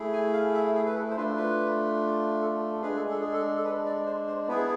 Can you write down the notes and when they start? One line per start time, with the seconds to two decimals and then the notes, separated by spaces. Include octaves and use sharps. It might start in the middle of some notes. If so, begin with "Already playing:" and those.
Already playing: A3 E4 G#4
0.13 G#5
0.33 F5
0.54 E5
0.75 G#4
0.86 B4
0.95 A4
1.10 C5
1.16 A3 D4 F4 B4
1.36 B4
2.41 A4
2.82 G#3 D4 G#4 B4
2.96 A4
3.10 A4
3.21 G#4
3.32 A4
3.56 A4
3.64 B4
3.86 D5
4.06 C5
4.27 C5
4.47 B3 E4 G#4 B4